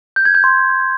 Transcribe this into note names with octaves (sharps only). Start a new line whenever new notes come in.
G6
G#6
G6
C6